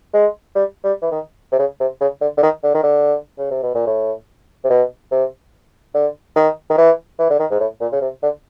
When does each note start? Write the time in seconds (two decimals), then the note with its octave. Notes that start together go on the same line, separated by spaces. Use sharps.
0.14 G#3
0.55 G3
0.84 G3
1.02 E3
1.11 D#3
1.52 C3
1.59 C#3
1.80 C3
2.01 C#3
2.21 D3
2.37 D3
2.43 D#3
2.63 D3
2.74 D#3
2.83 D3
3.38 C#3
3.51 C3
3.63 B2
3.75 A#2
3.87 A2
4.64 C3
4.70 B2
5.11 C3
5.94 D3
6.36 D#3
6.70 D#3
6.78 E3
7.19 E3
7.30 D3
7.40 D#3
7.50 G#2
7.60 A2
7.81 A#2
7.92 C#3
8.01 C3
8.23 D3